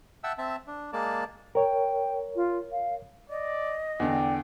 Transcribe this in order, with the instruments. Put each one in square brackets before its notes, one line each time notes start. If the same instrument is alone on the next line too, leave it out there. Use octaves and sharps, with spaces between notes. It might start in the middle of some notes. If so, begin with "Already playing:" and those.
[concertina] E5 F#5 G5 A5 E6
C4 E5 A5
D4
G#3 A#3 D5 A5
[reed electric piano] A#4 C#5 [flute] G5
[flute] F4
F5
[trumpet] D5 [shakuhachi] D#5
[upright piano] E2 D3 [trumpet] D5 [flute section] G5 G#5